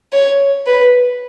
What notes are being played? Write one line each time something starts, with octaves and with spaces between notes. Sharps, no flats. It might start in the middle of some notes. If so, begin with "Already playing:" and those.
C#5
B4